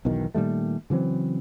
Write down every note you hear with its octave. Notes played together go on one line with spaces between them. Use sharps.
B1 E2 B2 D#3
A#2 D#3 G3 A3
C#3 E3 F#3 C4